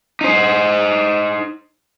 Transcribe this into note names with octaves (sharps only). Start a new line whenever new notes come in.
D#4 C5